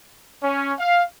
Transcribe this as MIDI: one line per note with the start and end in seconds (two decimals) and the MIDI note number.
0.43 0.73 61
0.79 1.03 77